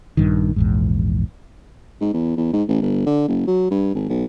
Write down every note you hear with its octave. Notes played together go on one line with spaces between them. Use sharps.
A#1 G2 D#3
A#1 E2 G#2
G#2
E2
E2
G#2
A1
G1
D3
F#1
F#3
G2
G#1
B1